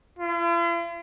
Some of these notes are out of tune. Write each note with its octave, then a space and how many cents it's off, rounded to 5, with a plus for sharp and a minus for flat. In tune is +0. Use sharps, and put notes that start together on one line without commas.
F4 -45